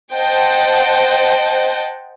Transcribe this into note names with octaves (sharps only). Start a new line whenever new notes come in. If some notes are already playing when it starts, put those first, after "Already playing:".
C5 D#5 F#5 G5 A5